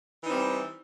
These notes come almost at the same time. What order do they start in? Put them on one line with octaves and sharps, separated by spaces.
E3 D#4 C4 G3